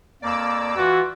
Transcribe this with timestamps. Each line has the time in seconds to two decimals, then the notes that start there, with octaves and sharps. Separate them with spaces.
0.22 F2 A#3 D5 D6 E6
0.77 E3 F4 F#4